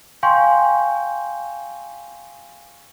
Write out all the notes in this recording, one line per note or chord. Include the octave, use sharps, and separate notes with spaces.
F5 G5 G#5 C6 C#6 G6